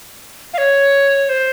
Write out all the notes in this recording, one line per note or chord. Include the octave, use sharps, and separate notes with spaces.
F5
C#5
C5